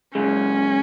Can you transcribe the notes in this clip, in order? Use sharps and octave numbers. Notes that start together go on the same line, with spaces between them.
F#2 C#3 G#3 C#4